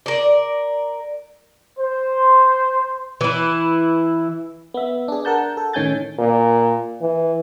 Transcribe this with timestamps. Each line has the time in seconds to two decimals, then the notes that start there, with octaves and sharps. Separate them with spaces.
0.06 A#4 D5
1.78 C5
3.21 E3 E4
4.74 B3 E5
5.08 D4 G#4
5.25 A#4 F#5 A5 G6
5.57 A4
5.73 A2 D#3 C#4 G#5 G6 A6
6.19 A#2
7.01 E3